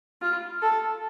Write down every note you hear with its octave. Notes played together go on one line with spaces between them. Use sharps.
F4
A4